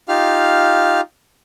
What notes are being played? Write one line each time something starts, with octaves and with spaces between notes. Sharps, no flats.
D#4 F4 G4 F5 F6